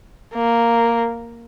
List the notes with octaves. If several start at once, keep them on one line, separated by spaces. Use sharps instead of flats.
A#3